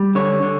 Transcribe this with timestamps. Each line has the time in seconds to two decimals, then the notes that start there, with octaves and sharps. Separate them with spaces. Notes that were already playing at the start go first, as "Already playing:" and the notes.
Already playing: G3
0.15 D3 C#5
0.43 D3